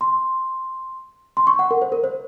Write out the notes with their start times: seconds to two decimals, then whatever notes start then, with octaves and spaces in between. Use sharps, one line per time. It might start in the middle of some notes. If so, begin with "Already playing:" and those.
0.01 C6
1.37 C6
1.47 C#6
1.59 F#5
1.71 A#4
1.82 C5
1.92 A#4
2.04 C5